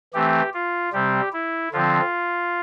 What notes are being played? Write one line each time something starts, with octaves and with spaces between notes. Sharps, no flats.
E3 A3 C4 G4
F4
C3 G3 C4 G4
E4
D3 F3 C4 F4